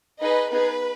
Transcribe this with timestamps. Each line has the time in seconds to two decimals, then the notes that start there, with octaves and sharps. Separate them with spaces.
0.21 D#4 G#4 B4 D#5
0.52 B3 D#4 G#4 B4